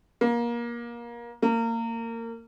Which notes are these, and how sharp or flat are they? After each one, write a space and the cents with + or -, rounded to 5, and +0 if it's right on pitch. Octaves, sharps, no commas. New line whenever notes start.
A#3 +25
A#3 -25